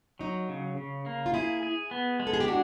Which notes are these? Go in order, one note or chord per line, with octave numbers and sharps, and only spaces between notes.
F#3 D#4
C#3
C#3
A#3
F4
E4 G#4
G#4
B3
G#3
A4
G#4
G4
D4 F#4